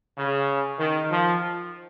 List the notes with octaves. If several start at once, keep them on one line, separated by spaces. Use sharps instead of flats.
C#3
D#3
F3